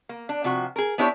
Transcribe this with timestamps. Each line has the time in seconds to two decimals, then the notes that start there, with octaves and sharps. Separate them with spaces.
0.09 A#3
0.29 D4
0.44 C3 F3 F#4
0.76 G#4 A#4
0.98 B3 D4 E4 G4 C5 C#5